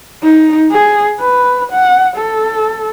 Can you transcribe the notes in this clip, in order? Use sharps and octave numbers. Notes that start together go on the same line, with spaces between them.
D#4
G#4
B4
F#5
A4